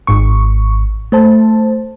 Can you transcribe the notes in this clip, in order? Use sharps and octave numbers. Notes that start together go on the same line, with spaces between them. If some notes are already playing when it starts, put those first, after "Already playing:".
G#1 G#2 C#6
A3 C5 A5